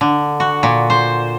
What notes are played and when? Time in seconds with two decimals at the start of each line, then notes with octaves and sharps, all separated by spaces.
0.01 D3
0.40 F#4
0.63 A#2
0.90 C5